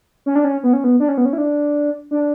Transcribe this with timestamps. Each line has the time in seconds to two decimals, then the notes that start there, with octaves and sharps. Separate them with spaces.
0.26 C#4
0.35 D4
0.45 C#4
0.63 B3
0.73 C#4
0.84 B3
1.00 D4
1.09 C#4
1.18 B3
1.25 C#4
1.33 E4
1.38 D4
2.11 D4